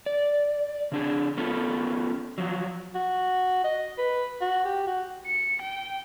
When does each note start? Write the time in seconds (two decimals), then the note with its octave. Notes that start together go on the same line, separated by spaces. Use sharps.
0.06 D5
0.92 C#3 D4 G#4
1.37 B3 C#4 F4 A4
2.38 F3 F#3
2.95 F#4
3.64 D#5
3.98 B4
4.41 F#4
4.65 G4
4.87 F#4
5.26 C#7
5.61 G5